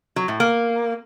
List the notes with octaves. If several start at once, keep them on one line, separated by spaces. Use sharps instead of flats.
F#3
A2
A#3